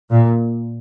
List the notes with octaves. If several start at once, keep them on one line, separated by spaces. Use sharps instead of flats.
A#2